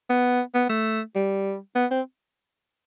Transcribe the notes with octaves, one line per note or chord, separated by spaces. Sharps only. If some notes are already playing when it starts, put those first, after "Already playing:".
B3
B3
A3
G3
B3
C4